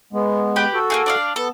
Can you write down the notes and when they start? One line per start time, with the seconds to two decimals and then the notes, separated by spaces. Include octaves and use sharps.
0.13 G#3 B3
0.56 G4 B4 G5
0.74 F#4 A4
0.90 A#3 D#4 G#4
1.06 D4 D5 F5
1.36 B3 A4